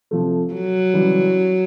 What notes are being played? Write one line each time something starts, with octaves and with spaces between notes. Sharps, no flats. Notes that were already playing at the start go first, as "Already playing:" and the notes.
C3 F3 A3
F#3
C#3 E3 G3